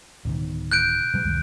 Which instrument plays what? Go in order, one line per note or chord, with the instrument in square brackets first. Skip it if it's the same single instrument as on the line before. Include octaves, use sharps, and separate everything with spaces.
[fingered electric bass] D1 B2 D#3
[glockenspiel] F#6 G6 D7
[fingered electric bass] B2 F#3 G3
C#2 F#2 D#3